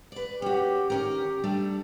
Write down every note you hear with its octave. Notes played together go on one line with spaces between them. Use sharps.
B4 D5
C#4 F#4 G4
D#3 C#4 G4 A#4
G3 A3 D4